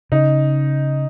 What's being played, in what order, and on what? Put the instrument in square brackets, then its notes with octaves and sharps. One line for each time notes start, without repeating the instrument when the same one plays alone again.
[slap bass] C#3 [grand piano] D#4